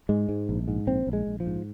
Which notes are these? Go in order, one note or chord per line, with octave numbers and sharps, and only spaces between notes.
G#2 G#3
G#2
A#1
G#2
A#1 C4
A#1
G#3
A#1
F3
G#2